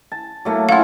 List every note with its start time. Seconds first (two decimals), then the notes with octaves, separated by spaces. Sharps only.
0.12 A5
0.45 F#3 A3 A#3
0.69 C#4 E4 F4 F5 F#5